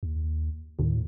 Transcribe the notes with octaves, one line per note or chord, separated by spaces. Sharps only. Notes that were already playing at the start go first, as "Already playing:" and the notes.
D#2
D#2 A2